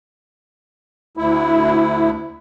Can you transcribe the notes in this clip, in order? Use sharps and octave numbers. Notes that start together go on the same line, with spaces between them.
D2 E4